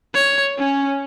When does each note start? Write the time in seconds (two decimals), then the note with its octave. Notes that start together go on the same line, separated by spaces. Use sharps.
0.14 C#5
0.58 C#4